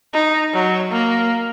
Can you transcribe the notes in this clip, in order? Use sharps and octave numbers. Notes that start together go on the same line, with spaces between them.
D#4
F#3
A#3